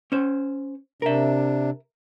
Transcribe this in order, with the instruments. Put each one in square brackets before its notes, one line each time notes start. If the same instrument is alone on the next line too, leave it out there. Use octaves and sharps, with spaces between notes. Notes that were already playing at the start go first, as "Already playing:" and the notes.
[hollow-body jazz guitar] C#4 C5
[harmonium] C3 D4 [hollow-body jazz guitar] A#4 E5